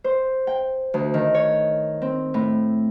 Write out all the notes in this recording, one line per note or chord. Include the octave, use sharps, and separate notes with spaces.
C5
G5
D2
D#3
C#5
C4
A2